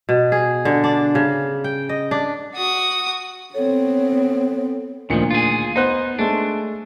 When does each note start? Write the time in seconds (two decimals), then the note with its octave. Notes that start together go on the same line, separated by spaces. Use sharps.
0.09 B2
0.32 G#4
0.65 D3
0.84 D4
1.15 C#3
1.64 G5
1.89 D#5
2.11 D4
2.55 F#4 D#6
3.55 B3 C4 A4 C#5
5.10 D2 A#2 D#3 F3 C#7
5.31 F4 G#4
5.76 B3 D#4 C5 F#6
6.19 G#3 A3 D4